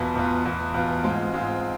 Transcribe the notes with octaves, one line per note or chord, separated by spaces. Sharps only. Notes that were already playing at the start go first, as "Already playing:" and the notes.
Already playing: E2 B2 B3 F4
E2 B2 B3 F4
E2 B2 B3 F4
E2 B2 B3 F4
G#2 G#3 C4 F4
G#2 G#3 C4 F4